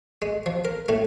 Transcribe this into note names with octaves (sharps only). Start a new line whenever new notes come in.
G#3
F3
A#4
A2 A3